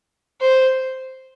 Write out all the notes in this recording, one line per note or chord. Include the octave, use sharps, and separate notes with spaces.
C5